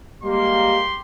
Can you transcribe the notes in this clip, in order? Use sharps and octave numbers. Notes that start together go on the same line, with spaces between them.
G3 G#3 A#3 G4 C6